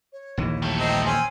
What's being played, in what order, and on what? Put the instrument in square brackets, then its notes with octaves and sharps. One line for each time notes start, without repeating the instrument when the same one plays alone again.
[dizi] C#5
[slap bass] A#1 D#2 E3
[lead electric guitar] G3 A3
[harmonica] C4 A#5 [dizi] D#5
[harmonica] C4 C#4 C6 [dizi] G#5